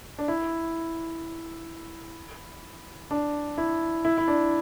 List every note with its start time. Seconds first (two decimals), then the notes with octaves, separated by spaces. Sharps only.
0.19 D4
0.28 E4
3.11 D4
3.58 E4
4.05 E4
4.18 E4
4.28 D4